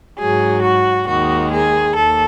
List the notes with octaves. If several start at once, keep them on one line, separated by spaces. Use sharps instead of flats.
G#2 F#3 G#4
F#4
D#2 D#3 G#3 F#4
G#4
D#2 A4